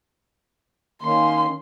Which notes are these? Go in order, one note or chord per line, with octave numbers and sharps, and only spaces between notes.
D#3 A#3 C#4 C6